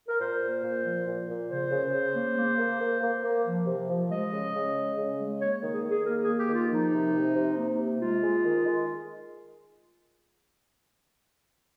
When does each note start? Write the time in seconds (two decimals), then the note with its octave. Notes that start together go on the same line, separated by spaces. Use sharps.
0.08 A#4
0.19 A#2 C5
0.41 A#3
0.62 A#2
0.84 F3
1.06 A#2
1.28 A#2
1.49 C#3 C5
1.70 C#3
1.92 C#3
2.15 A#3
2.36 A#3
2.58 A#3
2.79 A#3
3.01 A#3
3.23 A#3
3.45 F3
3.66 C3
3.88 F3
4.10 G#3 D#5
4.31 C#3
4.53 C#3
4.75 G#3
4.96 C#3
5.18 G#3
5.39 A#3 C#5
5.61 D#3
5.72 G#4
5.83 D#3
5.89 G#4
6.04 A#3 A#4
6.21 G#4
6.27 A#3
6.38 G4
6.48 D#3
6.54 F4
6.69 F3 D#4
6.92 C3
7.13 C3
7.34 C3
7.57 A#3
7.78 C3
7.99 G#3 F4
8.22 G#3
8.44 D#3
8.65 G#3